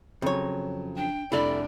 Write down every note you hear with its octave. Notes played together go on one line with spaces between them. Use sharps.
F2 C#3 F#3 C#5
D4 G5
F1 C2 D4 E4 A4 D5